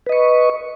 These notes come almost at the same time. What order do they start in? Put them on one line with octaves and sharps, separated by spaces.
B4 D#5 C#6